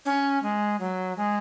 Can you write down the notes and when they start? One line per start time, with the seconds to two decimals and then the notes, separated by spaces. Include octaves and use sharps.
0.05 C#4
0.43 G#3
0.80 F#3
1.17 G#3